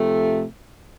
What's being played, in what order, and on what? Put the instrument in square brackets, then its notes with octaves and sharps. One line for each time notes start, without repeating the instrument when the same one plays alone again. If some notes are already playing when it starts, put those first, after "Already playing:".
Already playing: [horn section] C3 F3 A3